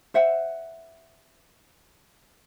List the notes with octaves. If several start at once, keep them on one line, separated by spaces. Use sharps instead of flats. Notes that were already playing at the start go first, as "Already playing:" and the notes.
C5 E5 F#5